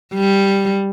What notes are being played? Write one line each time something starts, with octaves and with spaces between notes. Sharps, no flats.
G3